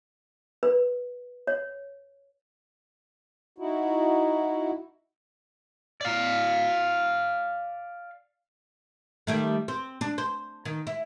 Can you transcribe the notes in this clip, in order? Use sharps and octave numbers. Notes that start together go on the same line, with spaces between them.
B4
C#5
D#4 E4 F#4
D5 F5
D#3 G3 A3
C4
D4
C5
D#3
E4